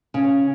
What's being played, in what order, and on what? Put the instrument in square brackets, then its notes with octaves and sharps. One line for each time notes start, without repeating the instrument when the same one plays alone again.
[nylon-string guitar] C#3